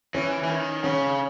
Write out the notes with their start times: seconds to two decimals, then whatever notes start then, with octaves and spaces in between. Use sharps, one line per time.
0.14 E3 C#4
0.44 E3
0.49 D#3
0.84 C#3 C#4